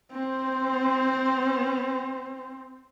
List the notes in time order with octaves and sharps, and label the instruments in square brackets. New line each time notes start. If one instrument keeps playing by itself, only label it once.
[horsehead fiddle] C4 C5